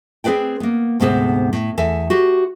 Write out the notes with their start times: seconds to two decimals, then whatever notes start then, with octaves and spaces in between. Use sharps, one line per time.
0.24 C4 G#4 B4 D5 G5
0.60 A#3 B3
1.00 D2 G#2 C3 B3 A4 C5
1.53 A2
1.78 E2 A4 E5 G#5
2.10 F#4 G4 C5